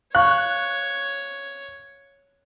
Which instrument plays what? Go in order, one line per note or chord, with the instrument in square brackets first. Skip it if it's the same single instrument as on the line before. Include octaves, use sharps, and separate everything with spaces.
[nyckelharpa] C#5 [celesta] F5 C#6 [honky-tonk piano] F#6